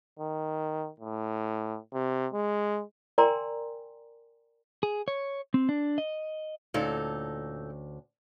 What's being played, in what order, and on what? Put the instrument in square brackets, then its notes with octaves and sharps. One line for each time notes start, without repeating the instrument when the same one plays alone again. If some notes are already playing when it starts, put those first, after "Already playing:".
[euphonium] D#3
A2
C3
G#3
[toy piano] A#4 D5 G5 G#5 A#5 C6
[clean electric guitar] G#4
C#5
C4
D4
D#5
[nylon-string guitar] D2 C#4 [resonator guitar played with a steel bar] A#2 D#4 A4